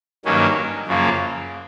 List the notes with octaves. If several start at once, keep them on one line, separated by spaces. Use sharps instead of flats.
G2 D#3 F#3 A#3 C#4
F#2 C#3 F3 A#3